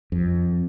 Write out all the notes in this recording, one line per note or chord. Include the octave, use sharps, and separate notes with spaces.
F2